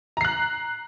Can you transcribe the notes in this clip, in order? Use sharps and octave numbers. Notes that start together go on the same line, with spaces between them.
A#5 F#6 C7